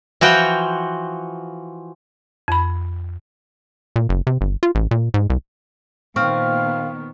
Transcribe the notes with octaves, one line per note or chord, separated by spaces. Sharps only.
E3 F3 F#4 G5
F2 B5
A#2
F#1
C3
G1
F4
A1
A#2
G#2
C2
A#2 D#3 B3 C4 F5 C#6 F6